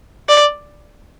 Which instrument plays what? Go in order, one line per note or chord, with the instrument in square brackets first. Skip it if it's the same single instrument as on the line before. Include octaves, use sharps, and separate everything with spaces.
[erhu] D5